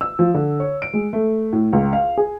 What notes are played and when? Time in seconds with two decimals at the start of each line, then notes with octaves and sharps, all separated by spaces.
0.01 E6
0.19 F3
0.34 D3
0.60 C#5
0.82 D7
0.93 G#3
1.13 A3
1.53 A2
1.73 C#2
1.93 F5
2.18 G#4